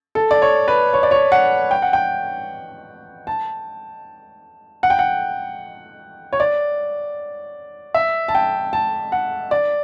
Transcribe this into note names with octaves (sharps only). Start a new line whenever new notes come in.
A4
D5
C#5
B4
C#5
D5
C#5
F#5
G5
F#5
G5
A5
F#5
G5
F#5
C#5
D5
E5
A5
G5
A5
F#5
D5